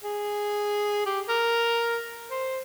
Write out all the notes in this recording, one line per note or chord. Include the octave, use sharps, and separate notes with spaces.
G#4
G4
A#4
C5